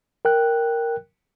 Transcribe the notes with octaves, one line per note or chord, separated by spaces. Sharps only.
A#4 G5 F#6